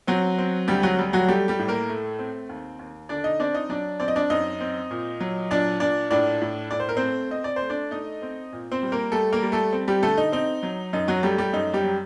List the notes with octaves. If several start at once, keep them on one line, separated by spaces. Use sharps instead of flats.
F#3 C4 F#4
C4
D2 G3 G4
F#3 F#4
G3
F#3 F#4
G3 A3 G4
G3 G4
A2
A#3 A#4
A3
C4
D#2
D#2
D3 D4 D5
D#4 D#5
C4 D4 D5
D#4 D#5
F#3 D4 D5
C4 D5
D#5
D4 D5
F#2 D#4 D#5
C4
A#2
F#3
A#2 D4 D5
A#2 D4 D5
A2 D4 D5
A2
A2 D5
C5
A#4
C4 C5
A3
C4 D#5
D5
C5
A3
D4 D5
A3 D#4 D#5
C4
A#2
C4 C5
G3
A#3 A#4
G3 A3 A4
A#3 A#4
G3
A3 A4
C4
G3 G4
D3 A3 A4
D#4
C4 D#4
F#3
F#2 D#4
F#3 F#4
G3 A3 G4
G3 G4
F#2 D#4
G3 G4
F#3